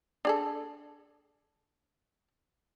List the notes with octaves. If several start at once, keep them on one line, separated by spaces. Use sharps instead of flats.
D4 G#4 A4